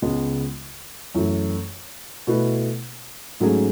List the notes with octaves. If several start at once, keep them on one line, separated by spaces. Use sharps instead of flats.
C#2 C#3 G#3 B3
F#2 E3 A3 E4
B2 A3 E4 B4
G#2 F#3 A3 C#4 G#4